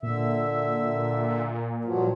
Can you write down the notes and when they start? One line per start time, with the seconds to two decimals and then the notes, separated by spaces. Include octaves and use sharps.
0.03 A#2 D3 E5
1.85 G2 F3 F#3